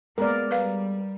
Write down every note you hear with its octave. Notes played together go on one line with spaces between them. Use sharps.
G#3 A#3 B3 A#4 D5
G3 B4 F5